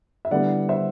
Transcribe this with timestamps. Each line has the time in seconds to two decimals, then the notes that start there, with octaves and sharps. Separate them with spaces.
0.25 E5
0.31 D3 G3 B3 E4 D5 F#5
0.69 C5 E5